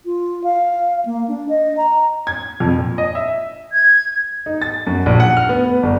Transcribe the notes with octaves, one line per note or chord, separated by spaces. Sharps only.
F4
F5
A#3
D4
D#5
A#5
G#6
F2
A#2
D#5
E5
G#6
D#4
A6
F#2
A#1
F#5
F6
B3
B3
G1